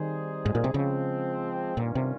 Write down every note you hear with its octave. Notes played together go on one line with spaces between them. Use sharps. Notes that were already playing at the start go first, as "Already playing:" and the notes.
Already playing: D#3 G3 C4 D#4 G#4 C5
G#2
A#2
C3
C#3 F3 G#3 C4
G2 A#2 D#3 G3 C#4 F4
C3